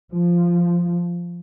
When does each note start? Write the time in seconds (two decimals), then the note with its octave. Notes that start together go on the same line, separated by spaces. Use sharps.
0.11 F3